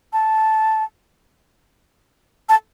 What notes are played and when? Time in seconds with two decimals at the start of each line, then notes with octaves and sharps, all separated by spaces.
0.13 A5
2.49 A5